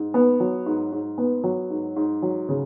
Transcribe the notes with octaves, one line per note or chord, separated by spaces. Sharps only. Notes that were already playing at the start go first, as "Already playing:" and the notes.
Already playing: G#2
B3
F#3
G#2
G#2
B3
F#3
G#2
G#2
F#3
C#3